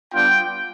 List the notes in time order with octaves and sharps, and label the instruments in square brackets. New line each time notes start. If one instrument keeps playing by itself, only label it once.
[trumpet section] G3 B3 D4 F4 G5